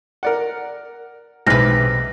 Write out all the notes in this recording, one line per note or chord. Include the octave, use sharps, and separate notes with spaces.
A#4 D5 F#5
B1 E2 C3 G#3 B4 F6 A#6